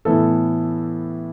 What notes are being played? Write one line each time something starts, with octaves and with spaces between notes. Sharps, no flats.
A2 E3 B3 E4 A4